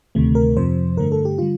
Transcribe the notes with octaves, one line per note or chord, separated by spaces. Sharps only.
D2 C3 D#3 A3
A#4
F2 C3 F3 C5
G2 D3 A3 A#4
A4
G4
D3 G3 F4